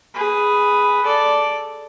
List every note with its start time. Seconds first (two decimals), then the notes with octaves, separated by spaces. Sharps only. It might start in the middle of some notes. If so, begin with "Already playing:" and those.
0.14 G#4 B4
1.05 A4 D5